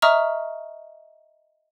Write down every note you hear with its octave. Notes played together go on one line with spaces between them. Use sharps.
D#5 E5 A#5 C#6 D#6 F6